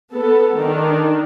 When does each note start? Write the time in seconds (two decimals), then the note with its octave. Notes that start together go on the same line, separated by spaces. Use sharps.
0.13 B3 A4
0.57 D#3 D4